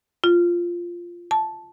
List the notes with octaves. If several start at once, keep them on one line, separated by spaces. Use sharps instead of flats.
F4
A5